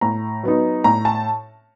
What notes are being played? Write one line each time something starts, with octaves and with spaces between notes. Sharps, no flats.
A2 A#5
F#3 B3 D#4
A2 A#5
A5